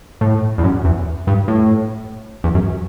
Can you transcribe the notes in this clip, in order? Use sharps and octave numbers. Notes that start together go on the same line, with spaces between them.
A2
E2
F#2
E2
G2
A2
E2
F#2